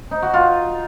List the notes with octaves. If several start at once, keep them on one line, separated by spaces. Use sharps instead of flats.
D#4
F#4
F4